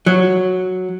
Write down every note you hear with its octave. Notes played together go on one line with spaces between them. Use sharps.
F#3